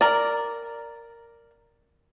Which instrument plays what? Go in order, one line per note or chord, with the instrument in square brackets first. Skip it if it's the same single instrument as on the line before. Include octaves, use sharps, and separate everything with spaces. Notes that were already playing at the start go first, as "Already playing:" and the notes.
[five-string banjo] A#4 D5